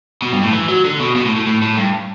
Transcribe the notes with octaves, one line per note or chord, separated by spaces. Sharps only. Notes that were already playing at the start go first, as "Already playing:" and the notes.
B2
G2
A2
E3
F#3
D3
B2
B2
A2
A2
A2
A2
G2